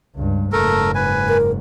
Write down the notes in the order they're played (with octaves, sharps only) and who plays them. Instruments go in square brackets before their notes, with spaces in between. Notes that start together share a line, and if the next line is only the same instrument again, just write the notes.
[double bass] C#2 G2
[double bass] F#1 G#2 [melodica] A3 A4 A#4
[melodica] B4 G#5
[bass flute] A#4